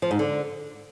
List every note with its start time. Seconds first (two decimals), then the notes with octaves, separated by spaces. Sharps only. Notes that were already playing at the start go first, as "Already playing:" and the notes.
0.02 F3
0.11 G#2
0.19 D3